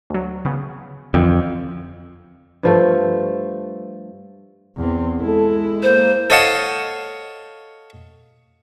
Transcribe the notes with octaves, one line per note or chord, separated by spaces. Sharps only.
D2 F#3
C#3 B3
F2 D3 E3 C4
G2 F3 A3
E2 C4
G#3 E4 A4
A#3 C5
A4 C#5 D#5 F5 F#5 A5